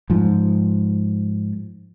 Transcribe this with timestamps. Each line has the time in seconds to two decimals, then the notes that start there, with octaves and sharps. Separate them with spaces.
0.10 G#2 F3